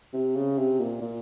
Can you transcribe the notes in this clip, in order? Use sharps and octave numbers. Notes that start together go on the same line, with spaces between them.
C3
C#3
C3
A#2
A#2